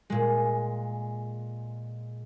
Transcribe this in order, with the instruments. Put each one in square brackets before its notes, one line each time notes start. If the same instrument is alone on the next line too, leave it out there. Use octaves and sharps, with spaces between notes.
[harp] A#2 G#3